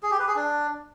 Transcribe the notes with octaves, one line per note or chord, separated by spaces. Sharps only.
G#4
G4
B4
G#4
D4